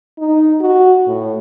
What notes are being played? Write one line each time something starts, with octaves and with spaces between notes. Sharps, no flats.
D#4
F#4
A2